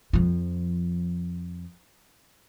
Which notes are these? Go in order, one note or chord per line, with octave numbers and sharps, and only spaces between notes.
F2 F3